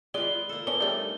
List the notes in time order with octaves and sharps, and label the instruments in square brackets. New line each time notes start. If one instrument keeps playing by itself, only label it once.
[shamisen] G#3 D5 [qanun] F4 B4 [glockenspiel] G7
[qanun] A#3 A4
[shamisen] B3 C#4 D4 [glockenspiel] G7
[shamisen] G3 A3 D4 [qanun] D#4